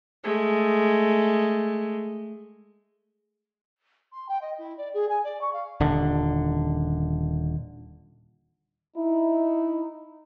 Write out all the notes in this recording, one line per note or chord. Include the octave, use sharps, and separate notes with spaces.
G#3 A3
C6
G5
D#5
E4
D5
G#4
G#5
D5
C#6
F5
D#1 D3
D#4 E4